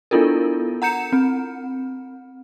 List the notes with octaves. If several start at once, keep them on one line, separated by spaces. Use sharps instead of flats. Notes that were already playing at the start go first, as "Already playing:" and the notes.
B3 D4 E4 F4 A4 A#4
F#5 A#5 G6 C#7 E7
C4